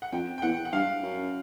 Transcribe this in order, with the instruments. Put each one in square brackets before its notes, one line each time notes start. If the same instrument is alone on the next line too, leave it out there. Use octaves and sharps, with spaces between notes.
[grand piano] F#5
[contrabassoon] F2 [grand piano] G5
[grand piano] G5
[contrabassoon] E2 [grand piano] F#5
[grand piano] F#5
[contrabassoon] G2 [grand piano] F5
[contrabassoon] F#2